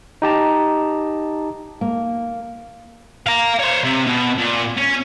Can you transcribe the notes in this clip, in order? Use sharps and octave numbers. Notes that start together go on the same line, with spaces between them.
D#4 G4 A5 A#5
A#3
F5 A#5
C5 C#5
C3
B2
A#2
C#4